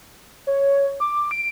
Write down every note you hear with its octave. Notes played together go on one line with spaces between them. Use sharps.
C#5
D6
D7